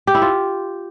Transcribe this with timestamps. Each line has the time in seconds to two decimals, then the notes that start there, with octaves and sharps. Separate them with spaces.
0.07 G4
0.15 E4
0.22 F4